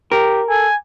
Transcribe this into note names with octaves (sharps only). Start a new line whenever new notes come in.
G4 A#4
A4 G#5